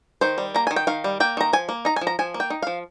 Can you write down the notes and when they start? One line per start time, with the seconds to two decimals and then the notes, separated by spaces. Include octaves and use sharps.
0.21 D#3 C5
0.38 G3
0.55 A#3 A#5
0.67 D#3 G#5
0.76 G5
0.87 D#3 F5
1.04 G3
1.20 A#3 G5
1.37 D#3 A#5
1.53 F3 G#5
1.69 A#3
1.85 D#4 A#5
1.96 G#5
2.01 F3
2.07 A#5
2.19 F3 G#5
2.34 A#3
2.40 G5
2.50 D#4
2.62 F3 F5